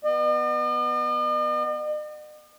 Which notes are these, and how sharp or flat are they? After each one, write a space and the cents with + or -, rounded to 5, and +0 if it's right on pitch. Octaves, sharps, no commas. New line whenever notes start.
B3 +0 D#5 -45